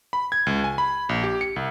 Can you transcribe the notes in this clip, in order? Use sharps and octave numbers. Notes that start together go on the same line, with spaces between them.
B5
G#6
C#2
G#5
B5
A#1
G4
C#7
C2